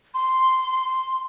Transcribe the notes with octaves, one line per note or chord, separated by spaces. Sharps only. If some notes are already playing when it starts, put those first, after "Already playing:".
C6